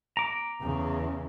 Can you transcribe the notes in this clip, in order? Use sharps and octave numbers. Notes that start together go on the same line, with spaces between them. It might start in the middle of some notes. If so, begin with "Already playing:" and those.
A#5 D6
E2 C#3